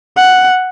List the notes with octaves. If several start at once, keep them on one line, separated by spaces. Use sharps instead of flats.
F#5